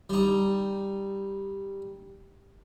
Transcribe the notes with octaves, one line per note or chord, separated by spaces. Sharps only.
G3 D#4